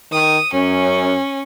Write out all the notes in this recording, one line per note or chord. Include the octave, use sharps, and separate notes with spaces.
D#3 D#6
F#2 C#4